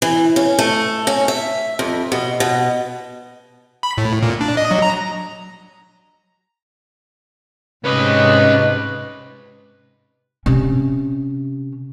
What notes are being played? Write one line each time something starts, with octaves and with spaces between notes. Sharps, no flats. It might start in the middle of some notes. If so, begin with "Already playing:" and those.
E3
C#4
A3
C#4
E5
F2
B2
B2
B5
A2
A#2
D4
D#5
F#3
A#5
G#2 C3 C#4 B4 D#5
C3 C#4